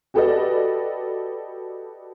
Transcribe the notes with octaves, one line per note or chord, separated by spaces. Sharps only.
F#4 G4 A4 B4 D5 D#5